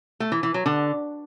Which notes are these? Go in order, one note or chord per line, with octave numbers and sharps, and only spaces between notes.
A3
E3
E3
F#3
D3